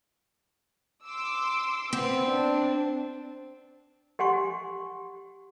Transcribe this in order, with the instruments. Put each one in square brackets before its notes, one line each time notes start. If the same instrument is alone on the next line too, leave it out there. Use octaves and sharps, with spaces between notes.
[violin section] C6 D6 E6
[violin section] B3 [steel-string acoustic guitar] C4
[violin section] D4
[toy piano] G4 F#5 G#5 C6 C#6